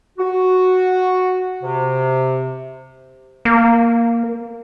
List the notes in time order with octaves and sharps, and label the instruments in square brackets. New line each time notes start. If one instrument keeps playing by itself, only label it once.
[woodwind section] F#4
C3
[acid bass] A#3